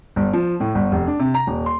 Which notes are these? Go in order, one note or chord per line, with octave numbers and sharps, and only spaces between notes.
G1
F3
A2
G1
F1
D4
C3
A#5
D#1
C6